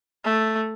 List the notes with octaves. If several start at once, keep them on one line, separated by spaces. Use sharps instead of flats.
A3